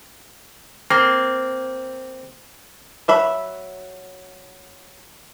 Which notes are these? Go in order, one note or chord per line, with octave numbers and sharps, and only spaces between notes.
A#3 C4
F#3 E5 B5